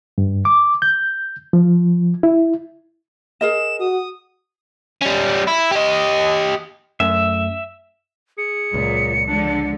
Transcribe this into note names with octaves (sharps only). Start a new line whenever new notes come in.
G2
D6
G6
F3
E4
G#4 A#4 D#5 E7
F#4 D#6
G3 C#4
E4
G4 D#5
F#2 A3 E5
G#4 C#7
C#2 A#2 F#3
D3 F3 G#3 D4